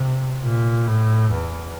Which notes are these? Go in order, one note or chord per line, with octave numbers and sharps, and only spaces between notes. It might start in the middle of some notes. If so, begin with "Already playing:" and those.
Already playing: C3
A#2
A2
E2